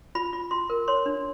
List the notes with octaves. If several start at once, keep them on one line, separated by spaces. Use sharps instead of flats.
F4 B5
F4
F4 C6
A#4
C#5 C6
D4